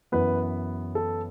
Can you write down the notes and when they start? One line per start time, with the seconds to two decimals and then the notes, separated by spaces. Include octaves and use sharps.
0.12 F#2 E3 B3 B4
0.95 A4